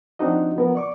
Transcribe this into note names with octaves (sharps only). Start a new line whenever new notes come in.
F3 C4 D4 D#4 F#4 D#5
F3 B3 A#4
D5 C#6 D6